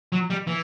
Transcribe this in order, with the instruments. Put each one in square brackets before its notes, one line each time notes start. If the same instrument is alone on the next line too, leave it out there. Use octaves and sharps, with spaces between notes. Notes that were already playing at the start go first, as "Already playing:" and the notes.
[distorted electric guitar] F#3
G3
E3